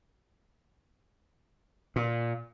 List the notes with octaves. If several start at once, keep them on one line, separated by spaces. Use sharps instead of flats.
A#2